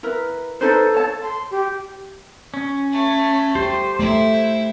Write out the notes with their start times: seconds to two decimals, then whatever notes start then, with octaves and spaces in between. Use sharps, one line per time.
0.03 E4 A#4 B4
0.61 D#4 A4 B4 C5
0.94 C#5 A5
1.23 C6
1.51 G4
2.54 C#4
2.92 A3
3.55 G4 C5
3.99 A3 E4